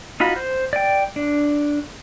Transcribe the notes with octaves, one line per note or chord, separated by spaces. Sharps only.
D#4 F4 F#4 B5
C5
D5 G5
D4